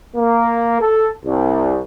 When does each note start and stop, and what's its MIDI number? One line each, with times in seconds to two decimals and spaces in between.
0.16 0.80 58
0.81 1.09 69
1.24 1.81 36